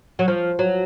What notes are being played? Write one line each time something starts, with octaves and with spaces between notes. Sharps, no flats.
F#3
F3
F#3